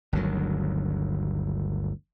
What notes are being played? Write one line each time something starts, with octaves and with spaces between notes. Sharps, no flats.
G1 D2 D#3 F#3